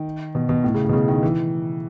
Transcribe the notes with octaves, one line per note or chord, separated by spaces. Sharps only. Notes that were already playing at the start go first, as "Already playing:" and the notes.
Already playing: D#3
B2
B2
A2
C#3
A2
B2
C#3
D#3
E3